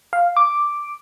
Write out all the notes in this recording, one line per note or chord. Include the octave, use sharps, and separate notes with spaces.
F5
D6